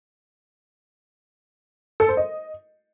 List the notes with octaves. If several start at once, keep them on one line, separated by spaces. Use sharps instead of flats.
A4
C5
D#5